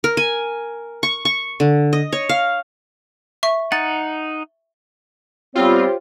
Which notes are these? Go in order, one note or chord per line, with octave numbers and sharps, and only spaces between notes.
A#4
G#5
C#6
C#6
D3
D#5
C#5
F5
E5 C#6
D#4 F#5 A6
G3 B3 C4 F4 G4 C5 C#5